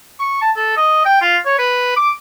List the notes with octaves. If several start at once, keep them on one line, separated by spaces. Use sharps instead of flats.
C#6
A5
A4
D#5
G5
F4
C#5
B4
D6